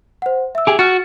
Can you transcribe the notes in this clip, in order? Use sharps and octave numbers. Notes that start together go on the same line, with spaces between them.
C5 F#5
E5 E6
G4 G#4
F#4 F6 A6